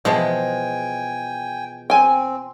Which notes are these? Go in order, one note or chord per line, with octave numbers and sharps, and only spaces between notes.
B2 E3 F3 G#3 G5 G#5
C4 G5 G#5